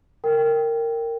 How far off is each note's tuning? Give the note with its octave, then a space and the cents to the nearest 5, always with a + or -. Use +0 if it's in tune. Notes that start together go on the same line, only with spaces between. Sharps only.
A#4 -15 G5 +0